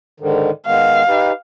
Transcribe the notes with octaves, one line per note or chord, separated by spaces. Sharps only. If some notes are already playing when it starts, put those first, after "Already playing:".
G#2 D3 D#3
D#3 G#3 B3 F5
D#4 G4 B4